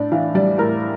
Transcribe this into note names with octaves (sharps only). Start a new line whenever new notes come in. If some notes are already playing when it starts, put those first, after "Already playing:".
Already playing: A2 D4 D5
E3 F5
G3 D5
A2 A#4